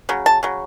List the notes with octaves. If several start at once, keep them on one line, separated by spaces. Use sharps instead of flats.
C#3 F#3
A5
C#3 F#3